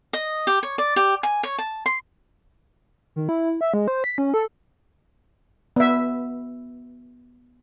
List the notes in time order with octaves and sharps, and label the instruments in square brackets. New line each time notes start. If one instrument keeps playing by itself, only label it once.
[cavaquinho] D#5
G4
C#5
D5
G4
G#5
C#5
A5
C6
[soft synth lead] D#3
E4
E5
G#3
C5
B6
C#4
A4
[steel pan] B3 E5